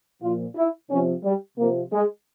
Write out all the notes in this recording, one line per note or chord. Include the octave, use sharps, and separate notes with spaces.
A#2 F3 F4
E4
C3 F3 C#4
G3
C3 F3 A#3
G#3